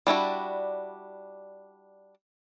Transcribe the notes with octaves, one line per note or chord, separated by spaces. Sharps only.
G3 D4 E4 F#4